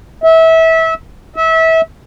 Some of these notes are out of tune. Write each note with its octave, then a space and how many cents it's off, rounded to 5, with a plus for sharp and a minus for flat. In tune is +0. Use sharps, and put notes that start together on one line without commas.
E5 -25
E5 -25